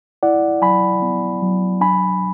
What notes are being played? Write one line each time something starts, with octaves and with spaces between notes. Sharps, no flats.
E4 D5 F#5
F#3 G#5 B5
B3
F#3
D4 G#5 B5